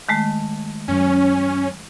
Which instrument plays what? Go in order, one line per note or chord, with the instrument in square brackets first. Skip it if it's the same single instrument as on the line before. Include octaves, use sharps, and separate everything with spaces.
[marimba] D#3 G#3 A3
[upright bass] F#2 [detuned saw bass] C#4